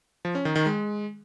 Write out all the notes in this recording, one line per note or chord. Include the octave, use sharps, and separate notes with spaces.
F3
C#4
D#3
D#3
G#3